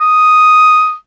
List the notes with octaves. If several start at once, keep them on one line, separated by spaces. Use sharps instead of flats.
D#6